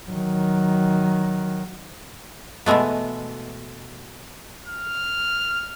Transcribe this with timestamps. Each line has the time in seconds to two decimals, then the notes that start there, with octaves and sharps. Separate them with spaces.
0.10 D#3 F#3
2.66 B2 E3 G#3 A3 B3
4.68 F6